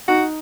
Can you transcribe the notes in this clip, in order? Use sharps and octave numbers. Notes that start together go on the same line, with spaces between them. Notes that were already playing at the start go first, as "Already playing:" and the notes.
D#4 F#4